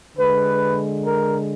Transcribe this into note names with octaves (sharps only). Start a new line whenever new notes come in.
D3 G#3 B4
A#4